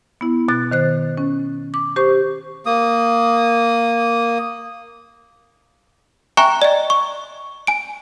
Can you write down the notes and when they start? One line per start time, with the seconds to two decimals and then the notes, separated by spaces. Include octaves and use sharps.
0.21 B3 E4
0.48 B2 F#6 A6
0.71 D#3 C5 F#6
1.18 C#4
1.74 D6
1.96 G4 C5 C#6
2.66 A#3 D#6
6.37 E5 G5 G#5 A#5 C#6 F#6
6.62 D5 D#5
6.90 C#6
7.67 G#5 D7